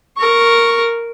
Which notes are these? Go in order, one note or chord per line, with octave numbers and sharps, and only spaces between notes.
A#4 C#6